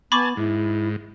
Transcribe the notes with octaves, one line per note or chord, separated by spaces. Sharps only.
B3 G#5 A5 B5 C#6 D6
G#2 E4